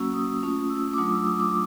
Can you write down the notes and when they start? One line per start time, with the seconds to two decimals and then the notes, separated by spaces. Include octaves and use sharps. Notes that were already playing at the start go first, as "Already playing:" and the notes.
Already playing: F#3 A#3 C#4 F#4 E6
0.13 D#6
0.42 A3 C#4 F4
0.69 E6
0.93 D6
0.97 F#3 A3 D4 F4 D#6
1.12 E6
1.27 D#6
1.40 D6